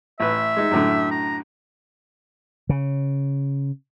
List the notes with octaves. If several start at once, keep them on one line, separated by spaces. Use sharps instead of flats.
A1 B4 E5
G#3 D#4
F#2 A2 D3
A#5
C#3